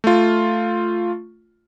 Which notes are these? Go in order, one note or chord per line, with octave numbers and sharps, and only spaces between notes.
A3 F4